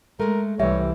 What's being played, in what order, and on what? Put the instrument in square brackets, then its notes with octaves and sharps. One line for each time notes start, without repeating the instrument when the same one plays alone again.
[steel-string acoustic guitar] G#3 A3 [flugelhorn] A#4
[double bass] C2 E3 [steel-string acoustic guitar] G3 [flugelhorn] C#5 [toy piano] E5